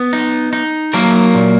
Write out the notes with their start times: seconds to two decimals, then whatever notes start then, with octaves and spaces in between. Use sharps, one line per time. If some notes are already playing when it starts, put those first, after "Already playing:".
Already playing: B3
0.13 D#4
0.53 D#4
0.93 F#3 A#3 A#4
1.35 A#2